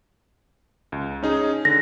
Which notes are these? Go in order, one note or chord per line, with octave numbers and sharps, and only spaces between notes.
C#2
C#4 D#4 G#4
D3 A#6